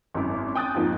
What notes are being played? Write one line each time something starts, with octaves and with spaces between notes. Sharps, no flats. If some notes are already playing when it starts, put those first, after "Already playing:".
G#1 F#2 E4 D6
G5 G#5 D#6 F#6 G6 A6
F2 G#2 F3 A#3 D#4